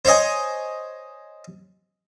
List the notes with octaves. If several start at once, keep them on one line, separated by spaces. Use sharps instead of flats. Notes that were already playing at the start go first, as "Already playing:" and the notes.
C5 C#5 D#5 G#5